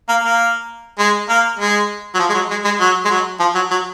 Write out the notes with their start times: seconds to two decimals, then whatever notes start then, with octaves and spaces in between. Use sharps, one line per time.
0.09 A#3
0.24 A#3
0.99 G#3
1.29 A#3
1.59 G#3
2.14 F#3
2.19 F3
2.29 G#3
2.34 F#3
2.50 G#3
2.64 G#3
2.80 F#3
3.05 G#3
3.10 F#3
3.40 F3
3.55 F#3
3.71 F#3